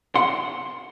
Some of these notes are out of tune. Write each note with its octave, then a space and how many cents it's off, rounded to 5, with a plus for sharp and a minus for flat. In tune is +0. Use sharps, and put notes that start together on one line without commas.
F#5 +0 C6 +0